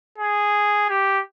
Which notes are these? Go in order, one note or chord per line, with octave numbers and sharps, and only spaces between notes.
G#4
G4